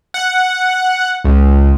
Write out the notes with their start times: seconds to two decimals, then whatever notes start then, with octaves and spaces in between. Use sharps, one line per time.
0.14 F#5
1.25 C#2